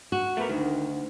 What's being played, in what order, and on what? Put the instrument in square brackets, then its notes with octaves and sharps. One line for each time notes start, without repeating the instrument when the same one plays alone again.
[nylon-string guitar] F#4
[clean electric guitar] A3 B3 A#4
[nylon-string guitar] D2 [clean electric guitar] D#3